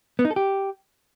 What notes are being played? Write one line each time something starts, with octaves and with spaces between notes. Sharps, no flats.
B3
D#4
A4
G4